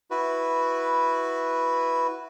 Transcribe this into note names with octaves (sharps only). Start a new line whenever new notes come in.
E4 F#4 B4